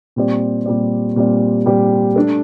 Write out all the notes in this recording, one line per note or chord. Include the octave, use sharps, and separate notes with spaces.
A#2 G3 C4 G4 D5
A#2 G3 C4 G4 D5
A#2 G3 C4 G4 D5
A#2 G3 C4 G4 D5
A3 D4 A4